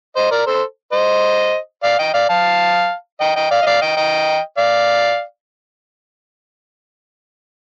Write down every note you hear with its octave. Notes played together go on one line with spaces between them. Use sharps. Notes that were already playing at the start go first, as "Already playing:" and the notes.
C5 D#5
A#4 D5
A4 C5
C5 D#5
D5 F5
D#5 G5
D5 F5
F5 A5
D#5 G5
D#5 G5
D5 F5
D#5
D5 F5
D#5 G5
D#5 G5
D5 F5